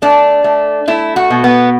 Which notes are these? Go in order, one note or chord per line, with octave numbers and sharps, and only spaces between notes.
A3 D4
A3
A3 E4
F#4
B2
B3